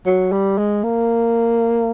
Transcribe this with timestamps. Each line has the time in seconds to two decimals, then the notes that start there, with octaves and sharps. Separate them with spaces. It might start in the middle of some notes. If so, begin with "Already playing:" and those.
0.06 F#3
0.32 G3
0.58 G#3
0.84 A#3